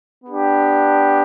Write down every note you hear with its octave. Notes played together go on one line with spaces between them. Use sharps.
B3 D4 G4